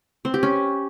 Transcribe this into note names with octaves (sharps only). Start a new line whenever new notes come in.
C4
G4
C#4